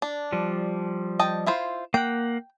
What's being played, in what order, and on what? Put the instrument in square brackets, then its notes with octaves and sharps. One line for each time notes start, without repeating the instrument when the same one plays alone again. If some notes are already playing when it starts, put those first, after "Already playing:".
[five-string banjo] D4
[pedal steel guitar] F3 G3
[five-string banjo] D#5 G5 A5
E4 F4 C5
[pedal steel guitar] A#3 F#5 [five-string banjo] G5